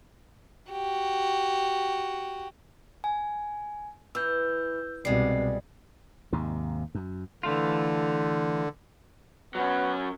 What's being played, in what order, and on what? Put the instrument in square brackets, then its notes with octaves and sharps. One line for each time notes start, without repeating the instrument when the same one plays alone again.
[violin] F#4 G4
[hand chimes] G#5
[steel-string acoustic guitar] E3 [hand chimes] E6 G6
[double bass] C2 B2 [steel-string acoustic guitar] G3 G#3 [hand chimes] C4 C7
[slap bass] D#2 G#2 C3
F#2
[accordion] D3 [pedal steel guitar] E3 A3 F4
[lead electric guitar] F#3 C#4 [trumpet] B3